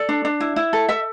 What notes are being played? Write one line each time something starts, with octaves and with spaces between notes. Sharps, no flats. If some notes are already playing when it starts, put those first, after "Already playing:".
Already playing: A4 D5
D4
D4
E4
E4
A4
A4 E5